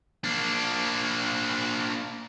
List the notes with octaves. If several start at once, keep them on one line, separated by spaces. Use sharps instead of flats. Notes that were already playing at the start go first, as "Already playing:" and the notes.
A#3 D4